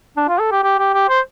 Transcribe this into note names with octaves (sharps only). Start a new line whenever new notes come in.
D4
F4
A4
G4
G4
G4
G4
C5